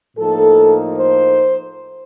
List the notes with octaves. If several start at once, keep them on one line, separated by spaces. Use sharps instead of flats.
A2 F3 A#3 D#4 A4
C5